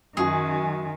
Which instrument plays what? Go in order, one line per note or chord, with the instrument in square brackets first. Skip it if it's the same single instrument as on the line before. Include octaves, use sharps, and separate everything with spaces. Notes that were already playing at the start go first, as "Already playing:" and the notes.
[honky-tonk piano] F#2 F#4 G#5 [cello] D#3 [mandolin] G#4